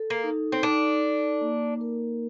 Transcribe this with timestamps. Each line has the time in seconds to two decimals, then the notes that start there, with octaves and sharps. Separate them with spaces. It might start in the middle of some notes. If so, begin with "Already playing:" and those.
Already playing: A4
0.10 A#3
0.24 D#4
0.52 C4
0.63 D4 D#4
1.02 D#4
1.41 A#3
1.81 A#4